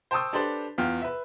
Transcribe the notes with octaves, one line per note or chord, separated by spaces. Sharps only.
C5 G5 A5 C#6 D#6 E6
D4 G4 A4 B4 C5 D5
E2 F4 G5 F6
B4 E5